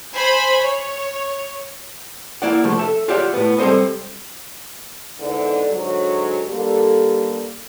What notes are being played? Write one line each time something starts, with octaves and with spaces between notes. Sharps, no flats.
C5 G#5 B5
C#5
A#3 E4 D5 F#5
C2 D3 F3 G3 A3
A4 E5
F4 G4 C#5 D5 E5 F#5
A2 B3
G3 C4 A4 C5 D#5
E2 G#2 D3
G#2 D3 F#3
D3 G3 A#3 G4 A4